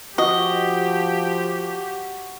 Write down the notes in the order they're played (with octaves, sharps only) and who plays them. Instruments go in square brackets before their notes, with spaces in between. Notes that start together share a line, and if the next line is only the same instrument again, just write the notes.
[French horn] F3 [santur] F#4 [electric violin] G4 [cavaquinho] D#5